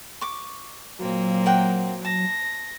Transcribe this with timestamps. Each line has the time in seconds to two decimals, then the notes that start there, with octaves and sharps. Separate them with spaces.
0.21 C#6 D6
0.99 A#2 F#3 A#3 C4
1.46 A#4 F#5 G5
2.05 A5 A#6